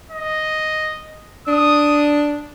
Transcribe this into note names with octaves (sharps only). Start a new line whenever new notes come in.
D#5
D4 D#6